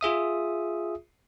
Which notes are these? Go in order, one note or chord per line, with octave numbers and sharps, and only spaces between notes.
F4 G#4 E5 D#6